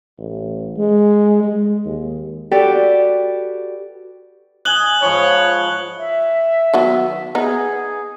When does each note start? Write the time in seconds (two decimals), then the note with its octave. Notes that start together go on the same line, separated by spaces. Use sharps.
0.18 A1
0.77 G#3
1.43 G#3
1.85 D#2
2.51 F#4 G4 A4 B4 D5 G5
4.65 D#5 G#5 F#6 F#7 G7
5.02 G#2 F3 C#5 B5
5.98 E5
6.74 D#3 F#3 B3
7.35 B3 D#4 G#4